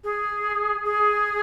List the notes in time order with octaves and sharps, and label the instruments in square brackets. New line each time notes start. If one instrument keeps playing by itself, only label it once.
[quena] G#4
G#4